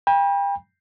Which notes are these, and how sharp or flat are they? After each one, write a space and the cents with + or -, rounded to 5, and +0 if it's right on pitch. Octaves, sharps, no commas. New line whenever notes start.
G5 +30 B5 -40